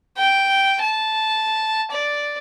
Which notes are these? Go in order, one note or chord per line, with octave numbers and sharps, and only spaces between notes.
G5
A5
D5